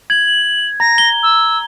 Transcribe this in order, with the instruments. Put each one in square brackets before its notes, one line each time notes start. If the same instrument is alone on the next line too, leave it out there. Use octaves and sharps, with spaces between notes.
[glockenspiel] G#6 [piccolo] F#7
[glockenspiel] A#5 [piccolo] A#6
[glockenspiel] G7
[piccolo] E6